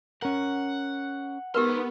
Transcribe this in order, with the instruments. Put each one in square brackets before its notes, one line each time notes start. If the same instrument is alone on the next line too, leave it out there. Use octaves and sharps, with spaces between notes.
[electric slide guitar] C#4 A#4 [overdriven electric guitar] F#5
[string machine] B3 [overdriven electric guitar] D#4 C6 [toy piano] G4 A#4 B4